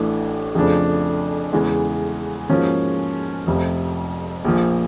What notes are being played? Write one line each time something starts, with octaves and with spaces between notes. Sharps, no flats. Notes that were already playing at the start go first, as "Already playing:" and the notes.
Already playing: A1 A2 E3 A3 D4
F2 C#3 F3 A3 D4
E2 C#3 E3 G#3
G#2 F3 A#3 C#4 F#4
F1 F2 C3 F3
A#1 A#2 F3